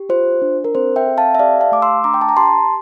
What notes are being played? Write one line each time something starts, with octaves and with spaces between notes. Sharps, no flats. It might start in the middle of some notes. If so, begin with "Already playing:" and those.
Already playing: G4
F4 C5
D4
A#4
C4 C5
E5 G5
A4
F5 A5
E5
G4 D5 F5
F5 A5
A3 D6
C6 E6
D4 A#5 D6
G5
A5
A#5
G4 A5 C6